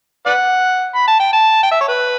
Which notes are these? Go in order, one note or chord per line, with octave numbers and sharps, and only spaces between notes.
B4 D5 F#5
B5
A5
G5
A5
G5
E5
C#5
B4